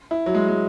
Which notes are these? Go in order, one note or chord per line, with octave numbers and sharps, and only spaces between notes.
E4
F#3
G#3
G#3